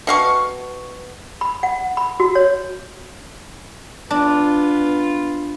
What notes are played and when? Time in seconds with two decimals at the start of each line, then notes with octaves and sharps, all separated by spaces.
0.07 B2 F5 C#6
1.41 B5
1.63 F#5
1.97 B5
2.20 F#4
2.35 C#5
4.11 B3 D4 F4